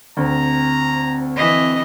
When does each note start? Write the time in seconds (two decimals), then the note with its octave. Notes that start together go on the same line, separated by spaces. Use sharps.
0.17 D2 C4 A#5
1.37 E3 D#5